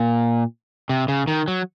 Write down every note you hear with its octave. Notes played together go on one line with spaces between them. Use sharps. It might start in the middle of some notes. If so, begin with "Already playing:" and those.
Already playing: A#2
C3
C#3
D#3
F#3